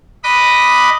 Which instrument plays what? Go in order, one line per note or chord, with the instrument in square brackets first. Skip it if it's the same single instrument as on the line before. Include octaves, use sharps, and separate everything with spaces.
[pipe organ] D#5 B5 D6 D#6 F#6